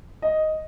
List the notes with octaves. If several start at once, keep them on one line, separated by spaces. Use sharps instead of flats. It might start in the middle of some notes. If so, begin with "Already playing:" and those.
D#5